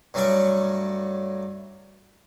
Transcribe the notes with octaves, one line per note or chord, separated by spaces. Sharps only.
G2 F#3 A3 C#4 D5 C#6